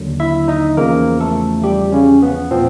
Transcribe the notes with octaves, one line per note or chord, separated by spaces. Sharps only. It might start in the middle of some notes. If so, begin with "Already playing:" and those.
Already playing: D#2 D3 F#3
E4 E5
D#4 D#5
E2 C#3 F3 A#3 A#4
A3 A4
G3 G4
C#3 C#4
B3
A#2 F3 C4